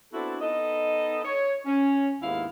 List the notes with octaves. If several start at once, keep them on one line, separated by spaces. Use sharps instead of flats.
B3 C4 D4 E4 F#4 A4
B3 D#4 A4 D#5
C#5
C#4
D#2 G#2 B3 E4 F5